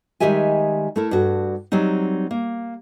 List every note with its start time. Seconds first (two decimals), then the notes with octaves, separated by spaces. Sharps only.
0.20 D#3 G3 G#3 G4 E5 G#5
0.96 A3 E4 A#4
1.11 G2 F#4
1.72 F#3 G3 C4 D#4
2.31 A#3